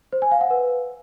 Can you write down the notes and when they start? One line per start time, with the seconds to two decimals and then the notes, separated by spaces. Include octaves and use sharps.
0.12 C5
0.22 G#5
0.31 F5
0.41 F#5
0.50 B4